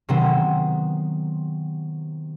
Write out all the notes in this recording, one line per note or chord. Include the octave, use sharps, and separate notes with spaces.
C3 D#3 F#3 B3 C4